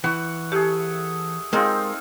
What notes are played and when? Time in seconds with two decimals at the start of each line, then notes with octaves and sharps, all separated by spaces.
0.04 E3 F#5 C#6
0.52 A3 G4 G#4
1.53 G#3 C4 D#4 F4 A#4 A#5